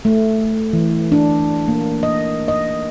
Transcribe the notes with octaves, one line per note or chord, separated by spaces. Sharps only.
A3
E3
D4
A#3
D#5
D#5